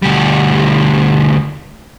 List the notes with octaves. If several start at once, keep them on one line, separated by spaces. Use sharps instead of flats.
D2 G3